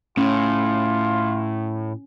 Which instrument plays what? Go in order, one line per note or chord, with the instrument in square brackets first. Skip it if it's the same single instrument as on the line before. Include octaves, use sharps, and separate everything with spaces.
[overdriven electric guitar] A2 [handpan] C#4 [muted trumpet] F4